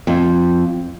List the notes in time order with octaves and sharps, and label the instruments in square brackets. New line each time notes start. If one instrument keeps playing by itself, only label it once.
[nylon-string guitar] F2